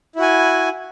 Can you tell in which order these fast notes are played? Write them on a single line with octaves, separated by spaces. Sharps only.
E4 F#4 G#5